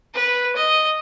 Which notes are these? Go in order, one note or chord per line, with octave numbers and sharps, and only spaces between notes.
B4
D#5